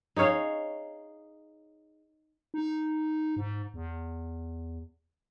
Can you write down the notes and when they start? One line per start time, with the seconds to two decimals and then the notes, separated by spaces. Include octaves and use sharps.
0.16 D#4 G#4 C#5 F5
2.54 D#4
3.37 G#2
3.74 E2